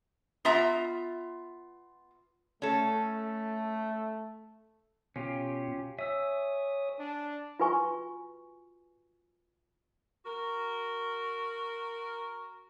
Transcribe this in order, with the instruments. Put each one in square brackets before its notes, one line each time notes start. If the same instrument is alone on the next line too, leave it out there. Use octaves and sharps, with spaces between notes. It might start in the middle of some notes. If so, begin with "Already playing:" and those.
[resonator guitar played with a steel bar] B3 F4 E5 A#5
[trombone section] A3 [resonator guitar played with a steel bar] C#4 A4
[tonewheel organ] B2 [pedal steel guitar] C#4 F4 G4
[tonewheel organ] C#5 D#6 [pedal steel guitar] E5 G#5 E6
[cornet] D4
[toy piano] F4 F#4 B4 G#5 C#6
[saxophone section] F#4 A#4